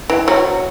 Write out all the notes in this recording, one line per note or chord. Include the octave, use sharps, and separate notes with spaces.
E3
F#3